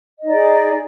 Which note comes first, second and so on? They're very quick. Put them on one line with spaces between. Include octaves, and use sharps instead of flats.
D#5 D#4 D5 G#4